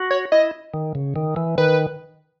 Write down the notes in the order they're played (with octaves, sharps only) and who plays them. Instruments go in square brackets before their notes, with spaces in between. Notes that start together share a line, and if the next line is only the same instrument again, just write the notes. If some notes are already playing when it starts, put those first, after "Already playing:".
Already playing: [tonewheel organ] F#4
[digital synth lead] C#5
[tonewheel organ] E4 [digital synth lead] D#5
[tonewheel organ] D#3
C#3
D#3
E3
[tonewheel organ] D#3 [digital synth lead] B4